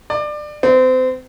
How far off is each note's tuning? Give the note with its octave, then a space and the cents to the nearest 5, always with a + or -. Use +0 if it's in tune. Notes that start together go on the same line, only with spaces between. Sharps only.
D5 +25
C4 -30